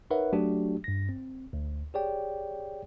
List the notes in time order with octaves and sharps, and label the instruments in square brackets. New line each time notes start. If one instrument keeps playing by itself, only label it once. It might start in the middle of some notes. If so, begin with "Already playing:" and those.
[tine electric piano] D#4 A#4 B4 C#5 E5 F#5
F#3 A3 D4 F#4 G4
G2 A#6
C4
D2
G4 G#4 C#5 D5 G5